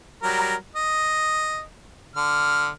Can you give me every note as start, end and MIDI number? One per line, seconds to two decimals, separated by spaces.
0.22 0.55 54
0.22 0.55 55
0.22 0.55 70
0.76 1.63 75
2.16 2.69 50
2.16 2.69 89